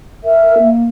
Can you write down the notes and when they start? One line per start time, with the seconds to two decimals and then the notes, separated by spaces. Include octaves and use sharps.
0.24 A#4 E5
0.58 A#3